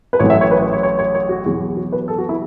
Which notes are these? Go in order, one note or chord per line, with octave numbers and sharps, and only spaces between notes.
B4
A1 A2 F#3 C#5
E5
C#5
B4
C#5
C#5
C#5
C#5
C#5
F#4
E2 B2 F#3
F#4
B4
A4
F#4
E4